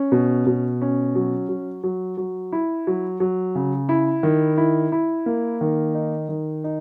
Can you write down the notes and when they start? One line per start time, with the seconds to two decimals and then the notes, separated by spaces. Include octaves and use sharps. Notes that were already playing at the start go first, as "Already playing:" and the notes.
Already playing: C#4
0.12 B2
0.47 B2
0.81 C#4
1.15 F#3
1.49 F#3
1.84 F#3
2.17 F#3
2.52 E4
2.87 F#3
3.20 F#3
3.55 C#3
3.89 E4
4.23 D#3
4.57 E4
4.92 E4
5.26 A#3
5.61 D#3
5.95 D#4
6.29 D#3
6.64 D#4